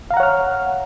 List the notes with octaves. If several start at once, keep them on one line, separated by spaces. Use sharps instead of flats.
C#5 F5 F#5 A#5 F6